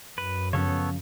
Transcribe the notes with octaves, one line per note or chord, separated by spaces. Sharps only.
F#2 B4
C#3 F3 B3 C#4 A4 C#5